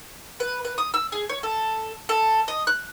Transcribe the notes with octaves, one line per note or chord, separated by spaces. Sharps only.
B4
B4
D#6
E6
G#4
C#5
A4
A4
D#5
F#6